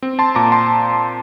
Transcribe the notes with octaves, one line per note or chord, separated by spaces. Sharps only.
C4
A5 C6
A#2 A#5 D6
A5 C6